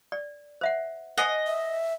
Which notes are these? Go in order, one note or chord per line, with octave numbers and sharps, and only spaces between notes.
D5
C5 E5 F#5
C5 D#5 F#5 G#5
E5